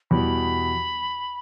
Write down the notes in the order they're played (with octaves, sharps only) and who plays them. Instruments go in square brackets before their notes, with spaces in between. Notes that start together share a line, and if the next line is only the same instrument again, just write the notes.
[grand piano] E2 B2 G3 [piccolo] B5